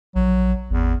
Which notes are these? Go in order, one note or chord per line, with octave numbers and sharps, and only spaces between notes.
A#1 F#3
G#1 E2